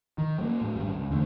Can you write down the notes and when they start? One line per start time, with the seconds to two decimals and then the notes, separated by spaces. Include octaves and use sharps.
0.18 D#3
0.39 F#3 G#3 A#3
0.61 A2 F#3
0.76 G#1 F#2 G3
0.94 C#2
1.10 E2 D3 G3 A3